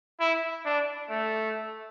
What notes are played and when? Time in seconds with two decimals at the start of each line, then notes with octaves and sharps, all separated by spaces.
0.20 E4
0.65 D4
1.10 A3